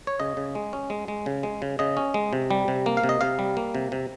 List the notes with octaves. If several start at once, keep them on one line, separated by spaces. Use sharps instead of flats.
C#5
C#3 D#5
C#3
G#3
C#4
G#3
G#3
C#3
G#3
C#3
C#3 D#5
C#4
G#3
C3
G3
C3
A#3
F5
C3
D#5
C3 F5
G3
A#3
C3
C3